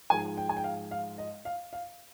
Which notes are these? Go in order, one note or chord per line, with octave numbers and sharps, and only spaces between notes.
G#2 F3 G#3 G#5
G5
G#5
G5
F5
F5
D#5
F5
F5